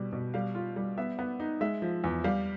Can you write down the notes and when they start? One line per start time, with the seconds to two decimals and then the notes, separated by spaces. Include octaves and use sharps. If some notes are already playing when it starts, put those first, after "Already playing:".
Already playing: B2 G3
0.13 B2
0.34 G3 F5
0.55 F4
0.76 G3
0.98 B3 E5
1.19 B3
1.40 D#4
1.61 G#3 E5
1.82 F3
2.04 E2
2.24 G3 F5